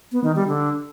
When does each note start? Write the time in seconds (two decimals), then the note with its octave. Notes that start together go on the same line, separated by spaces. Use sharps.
0.12 B3
0.24 D#3
0.36 G3
0.48 D3